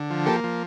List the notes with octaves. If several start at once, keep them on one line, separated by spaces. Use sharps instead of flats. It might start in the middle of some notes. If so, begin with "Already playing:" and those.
Already playing: D3
F3
A#3 G4 A4
F3